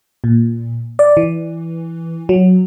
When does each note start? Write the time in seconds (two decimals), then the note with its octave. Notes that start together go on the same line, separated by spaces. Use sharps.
0.24 A#2
0.99 D5
1.17 E3
2.29 F#3